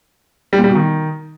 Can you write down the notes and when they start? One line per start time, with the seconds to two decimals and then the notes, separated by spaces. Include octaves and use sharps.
0.53 G3
0.58 A#2
0.64 G3
0.70 B2
0.75 D#3